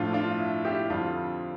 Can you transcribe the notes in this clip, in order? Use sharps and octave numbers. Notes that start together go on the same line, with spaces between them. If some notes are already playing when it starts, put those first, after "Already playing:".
Already playing: A2 F3 D4 F4
D4 F4
E4
E4 G4
F2 D3 G3 D4 F4